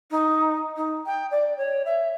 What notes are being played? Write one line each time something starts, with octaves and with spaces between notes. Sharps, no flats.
D#4
D#4
G5
D5
C#5
E5